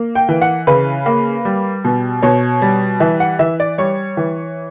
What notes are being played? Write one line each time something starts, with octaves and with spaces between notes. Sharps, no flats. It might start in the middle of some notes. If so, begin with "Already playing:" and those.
Already playing: A#3
G5
E3
F#5
C#3 B4
A#3
G3
B2
B2 C#5
G3
E3 E5
F#5
E3 E5
D5
G3 C#5
E3